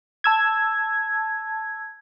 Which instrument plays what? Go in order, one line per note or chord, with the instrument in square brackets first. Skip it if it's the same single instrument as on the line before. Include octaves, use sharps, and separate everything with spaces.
[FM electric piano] A5 E6 G#6